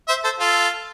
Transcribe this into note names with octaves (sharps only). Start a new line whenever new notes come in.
C5 E5
A4 C5
F4 A4